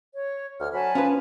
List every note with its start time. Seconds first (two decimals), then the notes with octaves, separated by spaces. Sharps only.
0.14 C#5
0.60 D2 F6
0.74 F#3 G#5 A5 B5
0.95 F3 C#4 B4